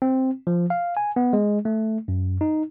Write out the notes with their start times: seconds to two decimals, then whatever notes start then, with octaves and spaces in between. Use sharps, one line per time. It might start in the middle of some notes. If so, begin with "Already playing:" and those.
0.02 C4
0.47 F3
0.70 F5
0.97 G#5
1.16 B3
1.33 G#3
1.65 A3
2.08 F#2
2.41 D#4